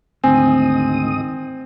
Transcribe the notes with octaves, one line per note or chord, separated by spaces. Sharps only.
D2 G#2 D#3 C4 G#5 D#6